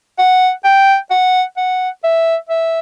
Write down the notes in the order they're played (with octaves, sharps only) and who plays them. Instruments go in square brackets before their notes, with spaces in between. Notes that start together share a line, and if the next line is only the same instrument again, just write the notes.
[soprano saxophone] F#5
G5
F#5
F#5
E5
E5